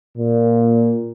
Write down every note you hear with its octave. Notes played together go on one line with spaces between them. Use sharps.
A#2